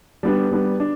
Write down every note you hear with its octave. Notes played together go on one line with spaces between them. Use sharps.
G3 B3 D4
G3 B3 D4
D4